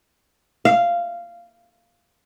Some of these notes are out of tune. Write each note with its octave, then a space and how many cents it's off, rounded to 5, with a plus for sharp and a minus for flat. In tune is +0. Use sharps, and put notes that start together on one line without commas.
F5 -10